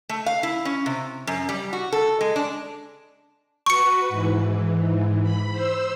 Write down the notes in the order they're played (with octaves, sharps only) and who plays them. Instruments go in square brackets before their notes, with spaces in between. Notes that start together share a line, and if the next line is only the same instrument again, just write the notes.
[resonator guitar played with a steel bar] A3
F5
E4
C#4
C3
F#2
G3
F#4
A4
G#3
D4
[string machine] F#4 B4 [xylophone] C#6 C#7
[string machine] G#2 E3
B5
C5 E6